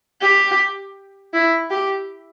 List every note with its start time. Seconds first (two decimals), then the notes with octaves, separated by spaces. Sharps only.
0.22 G4
1.33 E4
1.70 G4